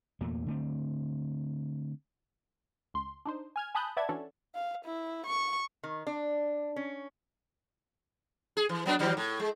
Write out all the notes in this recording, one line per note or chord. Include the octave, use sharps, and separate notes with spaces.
E2 A#2 A3 A#3
D3 A3 C4
C#2 C6
D4 D#4 C5
G#5 F6 G#6
G#5 A5 B5 D#6 F#6 G6
B4 D5 E5 F#5 A5 G#6
E3 C#4 D4 F#4 A4
F5
E4
C#6
D#3
D4
C#4
G#4
E3
F#3 B3 D4
D#3 F#3 G3
A2
G#3